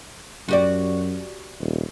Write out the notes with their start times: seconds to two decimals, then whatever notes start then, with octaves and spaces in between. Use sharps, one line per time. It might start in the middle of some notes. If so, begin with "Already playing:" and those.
0.48 F#2 F#4 G4 D5
1.60 D#1